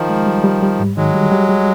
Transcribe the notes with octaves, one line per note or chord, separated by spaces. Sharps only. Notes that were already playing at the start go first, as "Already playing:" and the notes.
Already playing: D#3 F3
G#3
G3
G3
G3
G#2
D#3 F#3 G#3
G3
G3
G3